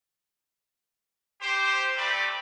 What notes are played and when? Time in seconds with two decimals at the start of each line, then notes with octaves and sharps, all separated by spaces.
1.41 G4 C5
1.96 A3 C4 G4 B4 D5